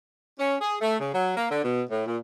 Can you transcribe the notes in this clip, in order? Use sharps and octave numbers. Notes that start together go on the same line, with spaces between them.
C#4
G#4
A3
C#3
F#3
A#3
D3
B2
A2
A#2